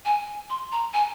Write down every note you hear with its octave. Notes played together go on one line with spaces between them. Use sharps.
G#5
C6
A#5
G#5